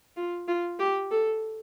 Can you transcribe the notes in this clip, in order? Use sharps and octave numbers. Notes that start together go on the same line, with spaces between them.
F4
F4
G4
A4